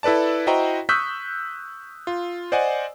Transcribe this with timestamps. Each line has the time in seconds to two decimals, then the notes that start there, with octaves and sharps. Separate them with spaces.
0.03 E4 A4 B4 D5 A5
0.47 E4 F#4 C5 D#5 G5 A#5
0.89 C#6 D#6 E6 F#6 G6 B6
2.07 F4
2.52 C5 D5 D#5 F#5 G#5